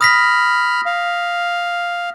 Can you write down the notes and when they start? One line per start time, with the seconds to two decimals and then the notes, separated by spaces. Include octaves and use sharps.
0.01 B5 D#6 F6 A#6 B6
0.86 F5